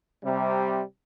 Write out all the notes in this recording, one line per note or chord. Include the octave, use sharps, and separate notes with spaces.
C3 G3